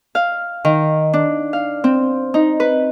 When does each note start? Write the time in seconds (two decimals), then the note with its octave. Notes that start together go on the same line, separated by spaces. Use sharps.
0.15 F5
0.65 D#3
1.13 D4
1.53 F5
1.84 C4
2.34 D#4
2.60 B4